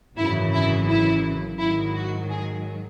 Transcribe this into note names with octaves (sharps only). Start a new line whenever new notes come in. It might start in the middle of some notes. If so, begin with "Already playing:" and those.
G#1 F#2 C#3 E3 E4
E4
E4
G#2 D#3 F#3 E4
F#4
G#4